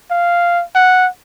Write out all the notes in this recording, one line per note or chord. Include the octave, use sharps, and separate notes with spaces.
F5
F#5